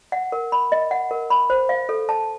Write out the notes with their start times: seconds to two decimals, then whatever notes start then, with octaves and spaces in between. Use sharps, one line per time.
0.12 F#5
0.32 A#4
0.52 B5
0.72 D#5
0.91 F#5
1.11 A#4
1.30 B5
1.50 C5
1.69 F5
1.89 A4
2.09 A5